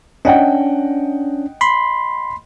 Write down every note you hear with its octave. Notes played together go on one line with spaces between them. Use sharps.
C#4 D4 D#5 F#5 G5
B5 C6